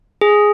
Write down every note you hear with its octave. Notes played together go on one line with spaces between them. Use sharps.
G#4